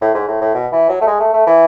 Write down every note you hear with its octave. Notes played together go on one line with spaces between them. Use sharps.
A2
G#2
A2
A2
B2
E3
F#3
A3
G#3
A3
A3
E3